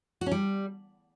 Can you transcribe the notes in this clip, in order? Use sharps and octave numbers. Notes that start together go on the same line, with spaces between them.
F#4
C#4
G3